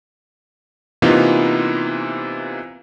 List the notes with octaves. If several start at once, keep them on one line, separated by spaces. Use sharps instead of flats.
C3 E3 A#3 B3 D#4 F4